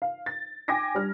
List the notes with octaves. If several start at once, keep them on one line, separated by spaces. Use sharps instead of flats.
F5
A6
G5 G#5 D6 G#6 A#6
G3 D4 F6